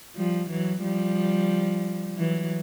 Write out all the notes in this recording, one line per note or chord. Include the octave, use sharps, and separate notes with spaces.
F3 G3
E3 F#3
F3 G3
E3 F#3